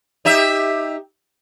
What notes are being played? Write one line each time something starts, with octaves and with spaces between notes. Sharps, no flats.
D#4 G4 E5